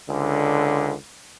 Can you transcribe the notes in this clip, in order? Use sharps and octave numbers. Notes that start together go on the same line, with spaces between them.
C#2 D3